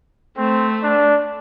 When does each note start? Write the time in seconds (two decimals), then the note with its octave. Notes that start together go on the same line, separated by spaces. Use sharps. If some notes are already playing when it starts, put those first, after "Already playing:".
0.37 A3 C4
0.83 D4